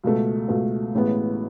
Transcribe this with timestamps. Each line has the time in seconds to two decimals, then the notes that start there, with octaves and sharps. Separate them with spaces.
0.03 C#2 B2 A3
0.49 C#2 B2 A3
0.94 A1 A2 G#3 B3